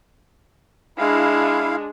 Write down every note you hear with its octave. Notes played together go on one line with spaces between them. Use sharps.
G#3 D4 E4 F5